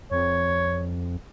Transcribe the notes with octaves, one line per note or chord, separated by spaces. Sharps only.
F2 C#5